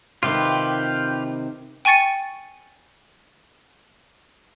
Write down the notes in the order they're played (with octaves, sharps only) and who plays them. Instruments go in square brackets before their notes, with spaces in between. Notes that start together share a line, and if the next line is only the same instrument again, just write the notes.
[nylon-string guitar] C3 D#3 [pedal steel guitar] F4 G4 B4
[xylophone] G5 G#5 C#6 A6 C#7 D#7